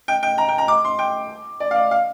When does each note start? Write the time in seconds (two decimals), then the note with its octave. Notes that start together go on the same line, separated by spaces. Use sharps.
0.08 G5
0.23 G5
0.38 A#5
0.49 G5
0.58 A#5
0.68 D6
0.85 C6
0.99 G5
1.60 D5
1.71 F5
1.75 D5
1.91 F5